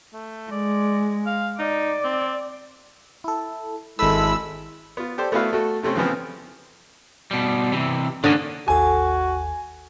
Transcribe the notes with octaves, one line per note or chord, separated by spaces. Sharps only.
A3
G#3 D5
F5
D#4 D5
C4
E4 A4
G#1 G#3 E4 A4 B5 E6
B3 F4
G4 A4 C5 D5
A3 B3 E4 F#4 B4 F5
A3 F#4 A4
C3 A3 C4 C#4
C#3 E3 F3 B3 C4
B2 G3
C3 E3
D3 D#3 A#3 C#4 D4 D#5
G#1 D#2 F#4 A4 G#5